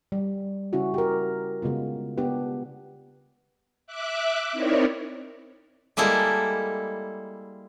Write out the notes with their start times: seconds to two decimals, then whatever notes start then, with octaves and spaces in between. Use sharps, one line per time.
0.12 G3
0.73 C#3 C#4 E4 F#4
0.94 G4 A#4
1.62 C#3 G#3 B3 F4
2.17 B3 D4 G4 B4
3.87 E5 D6 F#6
4.52 C4 D#4 E4 A#4 C#5 D5
5.97 G3 G#3 A#3 E4 A4